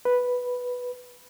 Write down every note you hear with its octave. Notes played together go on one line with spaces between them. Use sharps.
B4